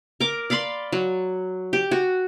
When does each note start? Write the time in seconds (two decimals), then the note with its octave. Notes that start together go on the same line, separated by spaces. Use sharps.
0.20 A#4 D6
0.50 D5 F5 B5 C6
0.93 F#3
1.73 G4
1.91 F#4